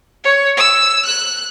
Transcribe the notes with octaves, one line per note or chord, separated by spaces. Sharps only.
C#5
E6
F#6